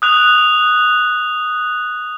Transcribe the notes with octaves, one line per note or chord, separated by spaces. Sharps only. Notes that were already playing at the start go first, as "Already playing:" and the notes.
D#6 F#6 F7